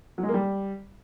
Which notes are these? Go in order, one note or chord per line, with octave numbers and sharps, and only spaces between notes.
F#3
G#3
A#3
G3